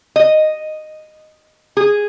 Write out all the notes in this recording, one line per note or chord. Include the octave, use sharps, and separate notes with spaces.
D#5
G#4